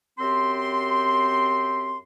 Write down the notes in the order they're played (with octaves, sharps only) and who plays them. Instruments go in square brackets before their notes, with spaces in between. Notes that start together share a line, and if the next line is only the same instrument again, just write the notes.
[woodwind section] F#2 C4 G4 C6